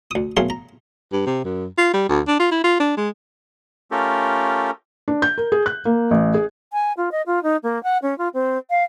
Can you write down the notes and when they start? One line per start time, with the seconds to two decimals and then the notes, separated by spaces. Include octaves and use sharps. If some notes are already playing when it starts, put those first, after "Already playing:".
0.11 D2 D#6
0.37 B1 F#2 A3 G#4 F5 C6
0.50 A#5
1.12 G2
1.26 C3
1.45 F#2
1.78 F4
1.94 G3
2.09 D2
2.27 D4
2.40 F4
2.51 E4
2.64 F4
2.80 D4
2.97 G#3
3.91 A3 C#4 F4 G4 A4 A#4
5.08 D4
5.22 G6
5.38 A#4
5.52 G#4
5.66 F#6
5.85 A#3
6.11 A1
6.34 G#4
6.73 G#5
6.97 F4
7.12 D#5
7.26 F4
7.43 D#4
7.63 A#3
7.83 F#5
8.02 C#4
8.18 F4
8.34 C4
8.70 F5